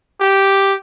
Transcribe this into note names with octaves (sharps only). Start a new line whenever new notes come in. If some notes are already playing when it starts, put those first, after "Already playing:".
G4